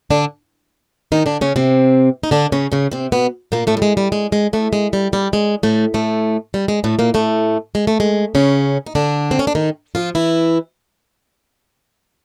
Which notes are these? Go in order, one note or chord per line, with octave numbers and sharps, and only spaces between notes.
D3 D4
D#3 D#4
D3 D4
C#3 C#4
C3 C4
D#4
D3 D4
C#3 C#4
C#3 C#4
C3 C4
B2 B3
A#2 A#3
A2 A3
G3
G#3
G3
G#3
G#3
A2 A3
G#3
G3
G3
G#3
A2 A3
A2 A3
G3
G#3
A2 A3
A#2 A#3
A2 A3
G#3
A3
G#3
C#3 C#4
D#4
D3 D4
C4
C#4
D4
D#3 D#4
F3 F4
E3 E4